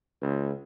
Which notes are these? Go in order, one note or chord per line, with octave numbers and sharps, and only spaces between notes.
C#2